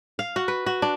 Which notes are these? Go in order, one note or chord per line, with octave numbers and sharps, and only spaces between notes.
F5
F#4
B4
F#4
D4